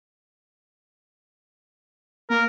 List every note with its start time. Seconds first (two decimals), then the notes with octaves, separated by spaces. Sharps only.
2.30 A#3 A#4